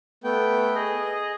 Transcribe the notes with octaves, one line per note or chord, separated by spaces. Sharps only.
A3 B3 G5
G#4 D#5